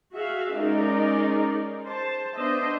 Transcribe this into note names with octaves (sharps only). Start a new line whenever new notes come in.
F#4 G#4 E5 F5
G#3 C#4 D#4 G#4 A#4 D5
C5 A5
B3 D4 C5 D#5 E5